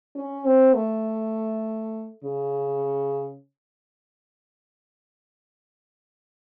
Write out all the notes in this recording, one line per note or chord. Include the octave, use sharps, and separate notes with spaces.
C#4
C4
A3
C#3